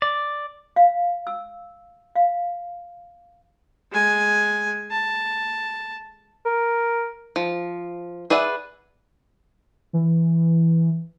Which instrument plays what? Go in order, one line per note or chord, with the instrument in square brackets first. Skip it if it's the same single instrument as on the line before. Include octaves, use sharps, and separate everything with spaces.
[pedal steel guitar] D5
[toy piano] F5
E6
F5
[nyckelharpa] G#3 G#5
A5
[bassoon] A#4
[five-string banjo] F3
G#4 B4 D5 E5 F#5
[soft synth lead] E3